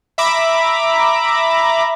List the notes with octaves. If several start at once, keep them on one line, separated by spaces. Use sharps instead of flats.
E5 A#5 B5 D6